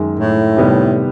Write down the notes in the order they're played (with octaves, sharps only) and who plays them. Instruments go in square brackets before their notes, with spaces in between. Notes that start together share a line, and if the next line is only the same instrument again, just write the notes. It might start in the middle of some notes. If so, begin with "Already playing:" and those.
Already playing: [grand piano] F#2 D#3 G#3
[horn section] A2
[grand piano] C3 D#3 G3 B3